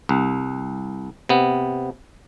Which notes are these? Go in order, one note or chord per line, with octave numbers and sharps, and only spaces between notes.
C2
C3 B3